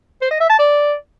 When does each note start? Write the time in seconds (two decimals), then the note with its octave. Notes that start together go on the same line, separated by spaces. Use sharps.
0.21 C5
0.31 D#5
0.40 E5
0.49 A5
0.59 D5